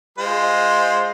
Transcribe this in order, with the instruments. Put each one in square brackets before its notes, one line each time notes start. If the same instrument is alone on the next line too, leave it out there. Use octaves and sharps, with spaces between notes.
[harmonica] G#3 F4 C5